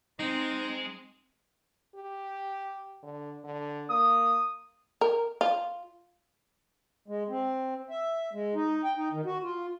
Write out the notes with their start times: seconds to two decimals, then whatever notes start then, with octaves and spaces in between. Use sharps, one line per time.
0.20 G#3 C4 D#4
1.95 G4
3.03 D3
3.44 D3
3.90 A#3 D#6
5.01 A#4
5.41 F4
7.08 G#3
7.29 C4
7.90 E5
8.33 G#3
8.55 D#4
8.84 G5
8.96 D#4
9.12 D#3
9.25 F#4
9.43 F4